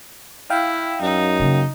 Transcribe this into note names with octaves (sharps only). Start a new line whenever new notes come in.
E4 F5 G5
F#2 D#4
C#3 A#3